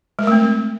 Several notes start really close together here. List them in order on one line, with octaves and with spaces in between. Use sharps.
G#3 A#4 A3 C4